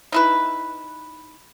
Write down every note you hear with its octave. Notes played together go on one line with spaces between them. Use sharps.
D#4 E4 B4